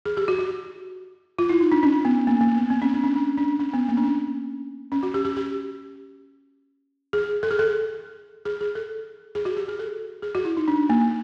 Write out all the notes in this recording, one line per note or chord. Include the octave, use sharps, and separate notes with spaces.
G#4
G4
F#4
F#4
F4
E4
D#4
D4
C#4
B3
A#3
A#3
B3
C4
C#4
D4
C#4
D4
D4
C#4
B3
A#3
D4
C#4
C#4
F#4
G4
G4
G4
G#4
A4
G#4
A4
G#4
G#4
A4
G#4
F#4
G4
G#4
A4
G#4
F#4
E4
D#4
D4
A#3